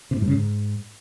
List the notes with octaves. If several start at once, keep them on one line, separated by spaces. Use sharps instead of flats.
C3
A2
G2
C#3
G#2